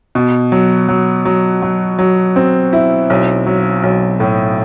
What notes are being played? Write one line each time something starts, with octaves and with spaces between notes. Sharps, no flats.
B2
F#3
F#3
F#3
F#3
F#3
C4
E4
B1
F#3
B1
A2